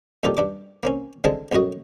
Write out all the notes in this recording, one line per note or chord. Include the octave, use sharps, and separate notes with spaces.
F2 A#2 D#4 F4 G4 A4
G2 D4 D6
A#3 C4 C#4
D3 G#3 C4 G#4 A4 A5
B1 F#2 A2 F#4 D#5